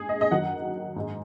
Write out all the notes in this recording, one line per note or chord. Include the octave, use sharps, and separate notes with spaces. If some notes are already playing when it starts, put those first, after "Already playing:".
Already playing: G#2 G#4
D#5
D#5
F#2 D#3 F#3 F#5
G#2 G#3